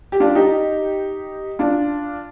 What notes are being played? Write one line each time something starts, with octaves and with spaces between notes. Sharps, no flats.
G4
D4 F4
D#4 G4
D4 F4